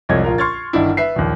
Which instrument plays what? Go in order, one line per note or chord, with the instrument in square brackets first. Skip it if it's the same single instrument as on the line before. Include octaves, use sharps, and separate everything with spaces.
[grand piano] C2 F2 G#3 C#5 G#6
A#1 F4 A#4
C6 C#6 F6 G#6 A6
G1 D#3 D4 E4
B4 E5 C7
A#1 D#2